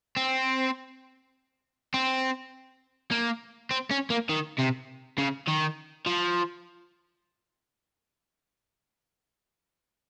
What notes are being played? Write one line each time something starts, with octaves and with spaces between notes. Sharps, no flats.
C4
C4
A#3
C4
C#4
A#3
D#3
C3
C#3
D#3
F3